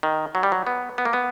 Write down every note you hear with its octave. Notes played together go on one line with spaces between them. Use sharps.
D#3
F#3
G3
F#3
B3
B3
A#3
B3